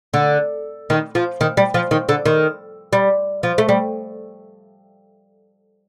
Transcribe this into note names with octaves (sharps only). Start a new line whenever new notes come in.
D3
D#3
F3
D#3
G3
F3
D#3
D3
D#3
G3
F3
A3
G3